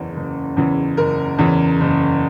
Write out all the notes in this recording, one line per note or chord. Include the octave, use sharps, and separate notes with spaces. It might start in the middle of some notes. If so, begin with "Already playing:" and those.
Already playing: F#1 E2 C#3 E3
F#1
E2 C#3 E3
F#1 A#4
E2 C#3 E3
F#1